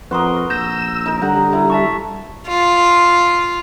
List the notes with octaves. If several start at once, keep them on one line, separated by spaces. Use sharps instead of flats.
F2 F#4 A#4 B4 C6 D#6
A#1 E6 G6 A#6
D#4 A#4
D3 G3 F#5 A#5
E4 A#5
E5 A5 C#6
F4